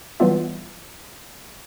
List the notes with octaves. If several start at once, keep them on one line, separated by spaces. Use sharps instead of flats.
E3 F#3 G3 B3 F4 E5